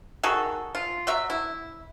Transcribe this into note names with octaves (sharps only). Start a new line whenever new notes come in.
D#3 F#4 G#4 A4
F4
F#3 F#4 E5
E4